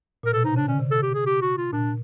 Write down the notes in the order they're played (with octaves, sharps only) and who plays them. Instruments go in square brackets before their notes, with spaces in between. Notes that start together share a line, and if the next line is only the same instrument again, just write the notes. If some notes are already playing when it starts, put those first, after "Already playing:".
[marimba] A#2 [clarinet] A#4
[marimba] B2 [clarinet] A4
[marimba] C3 [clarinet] D#4
[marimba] C#3 [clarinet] D4
[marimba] D3 [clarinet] C#4
[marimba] C3
[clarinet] A4
G4
G#4
G4
F#4
F4
[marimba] A#2 [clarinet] D4